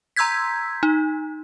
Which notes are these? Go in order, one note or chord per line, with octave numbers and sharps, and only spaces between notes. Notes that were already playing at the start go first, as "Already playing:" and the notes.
A#5 C6 E6 G6 G#6 B6
D#4